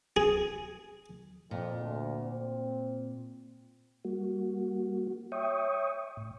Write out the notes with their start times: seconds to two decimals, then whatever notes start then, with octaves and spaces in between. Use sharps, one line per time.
0.16 G#4
1.51 F2 A#2
1.80 D2
2.22 C4
4.05 G3 A#3 F#4
5.32 C#5 E5 G5 C#6 D#6
6.17 A2